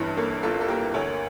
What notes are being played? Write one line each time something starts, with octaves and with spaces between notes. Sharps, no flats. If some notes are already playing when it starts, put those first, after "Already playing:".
Already playing: G1 G2 E3 C#4
A#3 A4 C#5
G1 F4 A4
A4
A#3 G4 A#4
D2 A4 C#5